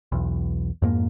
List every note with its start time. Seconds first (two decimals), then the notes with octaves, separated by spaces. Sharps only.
0.12 B1 E2
0.82 F2 G#2 A#3